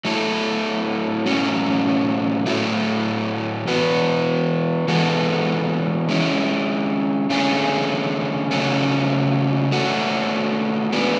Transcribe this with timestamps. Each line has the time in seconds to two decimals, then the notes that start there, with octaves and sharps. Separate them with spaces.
0.05 F#3 A3 E4 A4
1.26 A2 F#3 C#4
2.46 A2 F#3 A3 E4
3.67 E3 B3 F#4 B4
4.88 E3 G#3 B3 F#4 A4
6.09 G#3 C#4 E4
7.30 D3 A3 C#4 G#4
8.51 C#3 F#3 A3 C#4
9.72 A3 C#4 F#4
10.92 G#3 B3 D4